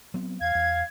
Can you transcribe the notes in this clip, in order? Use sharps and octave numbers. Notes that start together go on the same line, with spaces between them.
F#3 B3 C4
E2 F5 G#6
E2